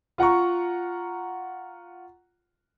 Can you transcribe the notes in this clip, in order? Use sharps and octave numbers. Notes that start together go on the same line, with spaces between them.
F4 F#5 A#5 C#6